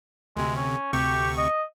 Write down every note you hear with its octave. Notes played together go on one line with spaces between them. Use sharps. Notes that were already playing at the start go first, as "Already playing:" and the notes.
D2 C3 G#3
C#4
D2 C3 G4 C#6
D#5